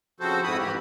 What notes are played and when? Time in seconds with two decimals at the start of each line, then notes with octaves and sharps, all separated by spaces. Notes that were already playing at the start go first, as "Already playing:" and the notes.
0.20 C#3 F3 C4 F#4 A4 C5
0.43 F2 G#2 E4 F#4 B5 D#6
0.58 G#2 E3 G4